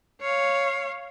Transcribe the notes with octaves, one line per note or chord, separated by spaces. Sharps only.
C#5 F5